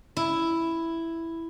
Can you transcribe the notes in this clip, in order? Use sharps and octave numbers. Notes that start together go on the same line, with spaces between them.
E4